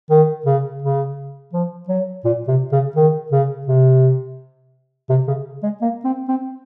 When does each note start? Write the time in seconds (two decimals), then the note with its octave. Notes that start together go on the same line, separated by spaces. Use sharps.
0.10 D#3
0.46 C#3
0.82 C#3
1.53 F3
1.89 F#3
2.24 A#2
2.48 C3
2.72 C#3
2.96 D#3
3.32 C#3
3.67 C3
5.10 C3
5.28 C#3
5.63 G#3
5.81 A#3
6.05 C4
6.28 C4